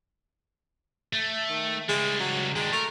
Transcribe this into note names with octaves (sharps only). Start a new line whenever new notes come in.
A3
D#3
C#2 G3 G#3
F#3
D#3 G#3 D4
A3 A#4